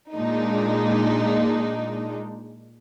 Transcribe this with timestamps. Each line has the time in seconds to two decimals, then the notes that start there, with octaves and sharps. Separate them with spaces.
0.14 A#2 G#3 D4 D#4